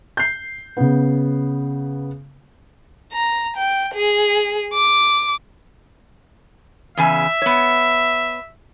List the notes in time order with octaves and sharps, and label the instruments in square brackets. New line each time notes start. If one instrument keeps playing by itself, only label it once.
[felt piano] G6 C7
C#3 B3
[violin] A#5
G5
G#4
D6
[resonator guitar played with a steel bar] E2 C#3 G#5 [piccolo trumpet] E5
[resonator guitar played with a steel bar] B3 C#5